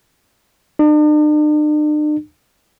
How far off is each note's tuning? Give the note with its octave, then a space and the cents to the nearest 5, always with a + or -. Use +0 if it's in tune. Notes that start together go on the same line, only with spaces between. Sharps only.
D4 +45